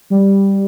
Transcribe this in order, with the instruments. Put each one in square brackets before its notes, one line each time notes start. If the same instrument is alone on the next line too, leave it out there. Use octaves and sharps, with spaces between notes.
[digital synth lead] G3